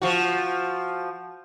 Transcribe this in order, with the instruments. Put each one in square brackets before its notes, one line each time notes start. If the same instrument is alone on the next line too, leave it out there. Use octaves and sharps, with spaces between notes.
[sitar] F3 F#4